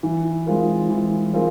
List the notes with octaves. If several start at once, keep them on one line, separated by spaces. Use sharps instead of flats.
E3
G#3 C4 F4 A#4
E3
G#3 C4 F4 A#4